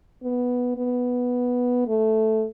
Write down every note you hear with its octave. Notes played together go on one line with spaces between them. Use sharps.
B3
B3
A3